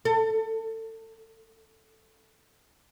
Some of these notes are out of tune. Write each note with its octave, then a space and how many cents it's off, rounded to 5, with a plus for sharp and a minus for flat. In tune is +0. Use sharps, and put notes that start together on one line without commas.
A4 +25